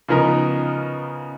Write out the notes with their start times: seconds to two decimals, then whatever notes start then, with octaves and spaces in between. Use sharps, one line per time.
0.08 C#3 F3 B3 D#4 A#4